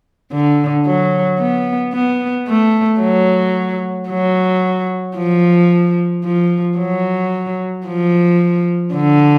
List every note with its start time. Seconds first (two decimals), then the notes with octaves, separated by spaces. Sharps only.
0.32 D3
0.86 F#3
1.40 B3
1.93 B3
2.48 A3
3.01 F#3
4.09 F#3
5.17 F3
6.25 F3
6.79 F#3
7.87 F3
8.94 D3